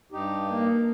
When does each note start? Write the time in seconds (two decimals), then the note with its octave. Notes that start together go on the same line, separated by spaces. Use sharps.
0.12 G2 D#4 G4
0.49 A#3